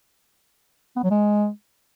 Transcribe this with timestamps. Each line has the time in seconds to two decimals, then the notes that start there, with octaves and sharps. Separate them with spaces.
0.96 B3
1.03 F#3
1.10 G#3